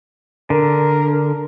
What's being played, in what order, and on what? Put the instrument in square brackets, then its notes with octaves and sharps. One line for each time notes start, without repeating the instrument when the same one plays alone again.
[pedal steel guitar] D3 [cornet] A#4